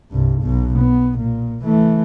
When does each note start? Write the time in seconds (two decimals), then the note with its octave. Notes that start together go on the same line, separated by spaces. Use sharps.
0.11 C2 G2
0.42 B1 B2
0.79 B3
1.19 A#2
1.64 E3 A3